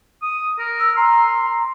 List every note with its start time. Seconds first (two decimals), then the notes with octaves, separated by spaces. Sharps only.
0.22 D#6
0.59 A#4
0.80 E6
0.97 A#5 C6